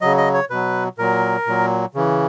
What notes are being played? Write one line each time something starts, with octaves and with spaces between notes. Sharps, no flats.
C#3 F#3 D#5
D#5
C#5
B2 F#3 B4
A#2 F#3 A#4
A#2 F#3
C#3 E3